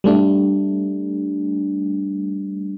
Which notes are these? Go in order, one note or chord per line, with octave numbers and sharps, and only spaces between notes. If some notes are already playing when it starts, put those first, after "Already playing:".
G3 A3 D4